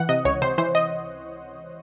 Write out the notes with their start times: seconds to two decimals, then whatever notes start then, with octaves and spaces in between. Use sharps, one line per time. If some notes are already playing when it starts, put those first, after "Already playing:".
Already playing: E3 F#5
0.09 C3 D#5
0.25 C#2 C#5
0.42 C3 C5
0.58 E3 C5
0.75 D#5